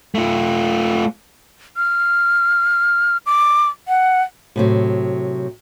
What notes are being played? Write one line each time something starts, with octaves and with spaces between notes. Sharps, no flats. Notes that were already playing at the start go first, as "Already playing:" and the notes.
A3 F4
F6
D6
F#5
A2 C3 F#3